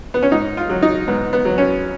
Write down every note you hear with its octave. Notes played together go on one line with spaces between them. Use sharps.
B3
C#4
G#2 D#4
F4
F#3
D#4
G#2 B3
B3
F#3
C#4